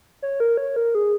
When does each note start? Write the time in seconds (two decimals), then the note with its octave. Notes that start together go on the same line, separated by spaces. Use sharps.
0.22 C#5
0.40 A#4
0.57 C#5
0.76 A#4
0.95 G#4